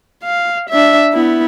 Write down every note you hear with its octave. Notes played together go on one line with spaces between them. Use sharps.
F5
D4 E5
B3 E4